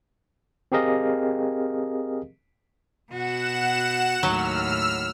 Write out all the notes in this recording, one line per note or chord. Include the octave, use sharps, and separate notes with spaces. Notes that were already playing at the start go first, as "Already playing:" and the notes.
C4 G4 G#4 A#4 D#5 F5
B2 F#4 F#5 E7
D#2 A2 F#3 E6 F6